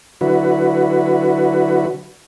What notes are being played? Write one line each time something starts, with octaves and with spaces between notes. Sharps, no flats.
D3 F#3 E4 F#4 B4